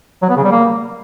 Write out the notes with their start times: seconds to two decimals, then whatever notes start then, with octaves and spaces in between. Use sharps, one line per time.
0.22 F#3
0.29 B3
0.37 C#3
0.44 G3
0.51 A#3